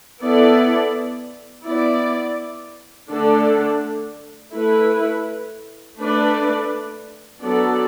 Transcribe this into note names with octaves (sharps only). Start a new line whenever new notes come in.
B3 E4 A4 D5
B3 E4 D5
D3 A3 D4 A4 D5
A3 E4 B4
A3 D4 B4 D5
F#3 B3 D4 A4 D5